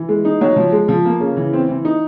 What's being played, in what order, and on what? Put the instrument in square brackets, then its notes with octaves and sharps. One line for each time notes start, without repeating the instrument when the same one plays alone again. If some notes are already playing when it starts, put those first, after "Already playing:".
Already playing: [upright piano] E3
G#3
D#4
F#3
F3
G#3
F3
A#3
C#3
E3
C4
E3
D#4